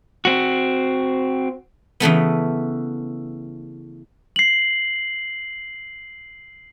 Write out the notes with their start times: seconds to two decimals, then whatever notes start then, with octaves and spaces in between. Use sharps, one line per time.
0.25 C4 F#4
2.00 C#3 E3 A3 B3
4.36 C7 F#7